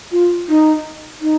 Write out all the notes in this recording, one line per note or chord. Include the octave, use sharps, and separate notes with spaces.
F4
D#4
D#4